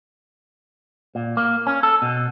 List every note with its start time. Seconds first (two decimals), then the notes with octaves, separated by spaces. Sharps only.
1.15 A#2
1.37 A#3
1.67 C#4
1.83 A4
2.02 B2